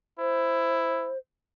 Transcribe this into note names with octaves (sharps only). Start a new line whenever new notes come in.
E4 C5